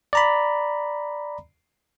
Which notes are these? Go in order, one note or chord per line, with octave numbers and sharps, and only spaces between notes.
D5 A#5 B5